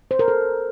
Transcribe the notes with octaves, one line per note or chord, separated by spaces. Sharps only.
C5
A#4
A4